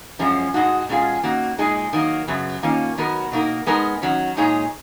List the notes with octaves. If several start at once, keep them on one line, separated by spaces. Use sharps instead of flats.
F#2 F3 G#3 C#4
G#2 D#3 G#3 D#4 F#4
B2 G#3 C#4 F4 G#4
D#3 A#3 C#4 F#4
A#2 G#3 D#4 G#4
D#3 F#3 A#3
F#2 C#3 F#3 B3
D#3 A#3 C#4 F4
D#3 F#3 B3 F#4 A#4
B2 A#3 D#4 A#4
G#3 B3 D#4 A#4
D#3 F#3 C#4
A#2 G#3 D#4 G#4 C#5